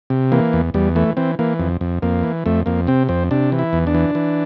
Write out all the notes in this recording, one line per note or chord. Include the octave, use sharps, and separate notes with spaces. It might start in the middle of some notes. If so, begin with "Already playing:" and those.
C3
E3 A#3
E2
E2 G3
E3 A3
E3 C4
E3 A#3
F2
F2
F2 A#3
E3
F2 A3
F2 A#3
C3 C4
F2 C4
C3 D4
E3
E4
E2
D4
E3
E3